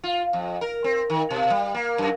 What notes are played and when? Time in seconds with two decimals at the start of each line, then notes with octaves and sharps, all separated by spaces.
0.04 F4
0.33 F2
0.61 A#4
0.84 C4
1.10 D#3
1.30 B2
1.50 G3
1.74 A#3
1.98 F#2